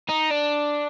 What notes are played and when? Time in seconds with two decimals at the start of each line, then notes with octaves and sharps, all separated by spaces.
0.09 D#4
0.31 D4